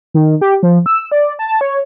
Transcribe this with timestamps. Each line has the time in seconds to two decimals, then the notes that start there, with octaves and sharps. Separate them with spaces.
0.14 D#3
0.41 G4
0.63 F3
0.86 E6
1.12 D5
1.39 A5
1.61 C#5